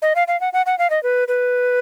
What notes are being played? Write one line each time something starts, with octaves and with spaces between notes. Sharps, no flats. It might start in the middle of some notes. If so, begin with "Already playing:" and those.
D#5
F5
F5
F#5
F#5
F#5
F5
D#5
B4
B4